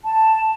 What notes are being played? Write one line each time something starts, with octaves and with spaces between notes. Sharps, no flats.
A5